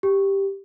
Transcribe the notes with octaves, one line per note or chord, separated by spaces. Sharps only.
G4